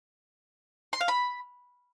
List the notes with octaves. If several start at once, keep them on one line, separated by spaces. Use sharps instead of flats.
C6
F5
B5